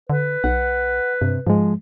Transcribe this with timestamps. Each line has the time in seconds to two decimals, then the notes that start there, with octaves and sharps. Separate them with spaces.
0.10 D3 B4
0.44 B1 F#5
1.21 G2 C3
1.47 G#2 F3 G#3